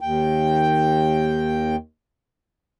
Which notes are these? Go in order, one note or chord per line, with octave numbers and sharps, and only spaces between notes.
D#2 G5